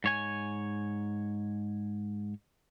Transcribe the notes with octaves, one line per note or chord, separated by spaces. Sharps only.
G#2 C#5 G#5